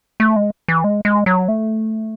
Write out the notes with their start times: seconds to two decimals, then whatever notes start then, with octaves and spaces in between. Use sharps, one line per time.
0.20 A3
0.36 G#3
0.68 E3
0.84 G#3
1.05 G#3
1.26 F#3
1.48 A3